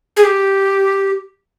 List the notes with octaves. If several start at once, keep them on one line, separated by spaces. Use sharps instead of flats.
G#4
G4